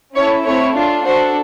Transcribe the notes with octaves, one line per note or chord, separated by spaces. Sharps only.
C#4 E4 A4 C#5
A3 C4 E4 C#5
D4 F4 A4
D4 F#4 A4 C5